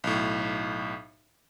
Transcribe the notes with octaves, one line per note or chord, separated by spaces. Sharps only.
B1 A2